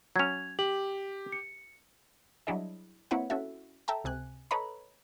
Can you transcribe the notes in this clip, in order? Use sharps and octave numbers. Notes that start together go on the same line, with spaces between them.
F#3 C#4 G#6 F7
G4 F#7
C#7
F#3 G3 D4 E4 G#4 D#5
A#3 C4 E4 B4 C#5 F#5
C#4 E4 F#4 A4 E5
A4 E5 G5 A5 A#5
C#2 C3 G#5 F#6
A4 B4 C#5 D#5 A#5 B5